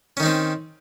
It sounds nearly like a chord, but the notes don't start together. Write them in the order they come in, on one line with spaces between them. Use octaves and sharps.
C#4 D#3 D#4 C4